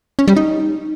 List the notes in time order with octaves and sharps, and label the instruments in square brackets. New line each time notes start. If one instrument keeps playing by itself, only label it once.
[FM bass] C#4
G3
D#4